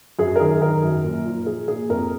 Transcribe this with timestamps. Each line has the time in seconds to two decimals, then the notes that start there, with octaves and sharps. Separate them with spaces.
0.19 F#2 G#4
0.36 A#4
0.40 D#3 G#4
0.61 D#3 A#4
0.83 F#2
1.04 A#2
1.26 F3
1.46 F3 G#4
1.68 A#2 G#4
1.89 F2 A#4